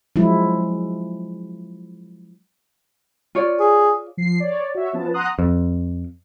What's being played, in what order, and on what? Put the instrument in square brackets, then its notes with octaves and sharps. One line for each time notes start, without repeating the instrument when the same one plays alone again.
[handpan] F3 F#3 G#3 E4
[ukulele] F4 C#5 D5
[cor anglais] G#4
[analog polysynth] F3 C7
C#5 D5
F#4 C#5 E5
F3 B3 C#4 A5
F#5 A#5 C6 D#6 F#6
[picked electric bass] F2